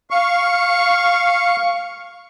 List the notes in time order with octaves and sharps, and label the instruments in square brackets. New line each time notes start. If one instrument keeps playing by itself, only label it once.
[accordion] F5 C#6